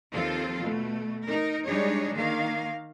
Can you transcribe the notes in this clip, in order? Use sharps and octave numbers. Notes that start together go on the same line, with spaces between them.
D#2 F3 C4 F4 A4
B2 A3
D#4 A#4
G3 G#3 D4 D#4 G#4 C#5
D#3 A#3 F5